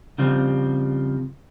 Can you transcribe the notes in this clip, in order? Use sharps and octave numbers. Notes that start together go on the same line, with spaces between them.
C#3 F3 G3 C4